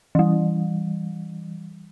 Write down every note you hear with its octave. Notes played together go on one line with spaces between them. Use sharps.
E3 G3